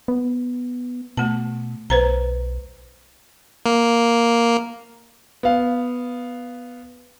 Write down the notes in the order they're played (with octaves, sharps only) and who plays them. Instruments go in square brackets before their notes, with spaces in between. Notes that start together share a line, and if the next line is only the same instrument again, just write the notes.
[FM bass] B3
[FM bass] B2 [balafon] A3 A5
[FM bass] B1 [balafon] B4 C5 A#5
[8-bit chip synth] A#3
[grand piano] B3 F5